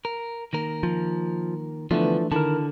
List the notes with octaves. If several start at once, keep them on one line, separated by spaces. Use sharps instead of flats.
A#4
D#3 A#3 A#4
F3
D3 E3 F3 A3 B3 D4
D3 D#3 E4 A#4 A5